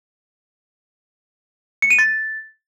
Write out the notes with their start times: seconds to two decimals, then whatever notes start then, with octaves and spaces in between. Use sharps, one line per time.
1.82 C#7
1.90 D#7
1.99 A6